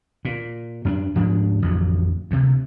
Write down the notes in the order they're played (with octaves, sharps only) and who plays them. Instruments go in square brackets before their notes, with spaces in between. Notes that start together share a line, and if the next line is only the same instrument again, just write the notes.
[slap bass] A#2
F#2 C4 D4
D2 G#2 F3 D4
A1 F2 D3 F#3
D2 C3